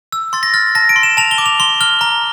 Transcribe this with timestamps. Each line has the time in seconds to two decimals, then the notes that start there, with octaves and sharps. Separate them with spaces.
0.12 E6
0.33 C6 A6
0.43 A#6
0.54 F6 A6
0.75 A5 A#6
0.89 D7
0.96 C6
1.03 E7
1.17 A5 F7
1.31 G7
1.38 D6
1.46 F7
1.60 C6 G7
1.81 F6 G7
2.01 A#5